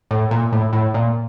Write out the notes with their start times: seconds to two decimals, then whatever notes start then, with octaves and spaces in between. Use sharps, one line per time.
0.11 A2
0.31 A#2
0.52 A2
0.73 A2
0.94 A#2